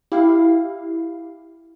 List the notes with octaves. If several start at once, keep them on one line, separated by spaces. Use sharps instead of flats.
E4 G4 F5